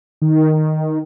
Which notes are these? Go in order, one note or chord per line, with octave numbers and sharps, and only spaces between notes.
D#3